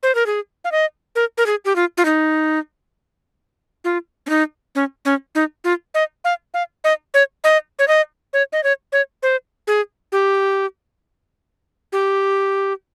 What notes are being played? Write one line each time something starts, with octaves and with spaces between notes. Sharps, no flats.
C5
A#4
G#4
F5
D#5
A#4
A#4
G#4
G4
F4
F4
D#4
F4
C#4
D#4
C#4
C#4
D#4
F4
D#5
F5
F5
D#5
C#5
D#5
C#5
D#5
C#5
D#5
C#5
C#5
C5
G#4
G4
G4